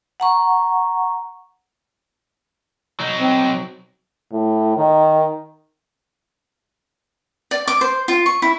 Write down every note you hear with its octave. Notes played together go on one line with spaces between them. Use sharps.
F#5 A#5 C#6
F#3 D#4
C4
A2
D#3
D5
D6
C5
F4
C#6
E4